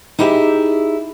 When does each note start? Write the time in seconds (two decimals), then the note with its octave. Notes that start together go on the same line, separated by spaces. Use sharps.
0.19 D#4 E4 G4 G#4 C#5 E5